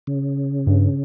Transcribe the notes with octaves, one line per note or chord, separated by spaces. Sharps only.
C#3
G2